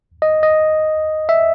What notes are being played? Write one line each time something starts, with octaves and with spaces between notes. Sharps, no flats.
D#5
D#5
E5